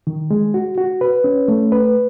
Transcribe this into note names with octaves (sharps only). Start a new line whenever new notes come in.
D#3
G#3
F#4
F#4
B4
C#4
A3
B4